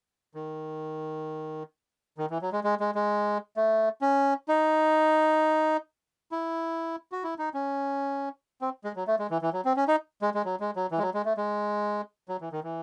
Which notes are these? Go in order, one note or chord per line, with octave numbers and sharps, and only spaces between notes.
D#3
D#3
E3
F#3
G#3
G#3
G#3
G#3
A3
C#4
D#4
E4
F#4
E4
D#4
C#4
C4
G#3
F#3
A3
G#3
E3
E3
F#3
C4
C#4
D#4
G#3
G#3
F#3
G#3
F#3
E3
G#3
F#3
G#3
A3
G#3
F#3
E3
D#3
E3